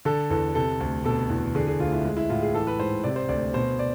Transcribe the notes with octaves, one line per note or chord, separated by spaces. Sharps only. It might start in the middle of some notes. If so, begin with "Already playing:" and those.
D3 A4
E2 A4
C3 A4
D2
B2 A4
E2
D3 G#4
G#4
D2 F4
E4
G#3
E4
A2 F4
G#4
E3 A4
B4
G#2 C5
C3 D5
C5
D2 D5
B2 C5
D5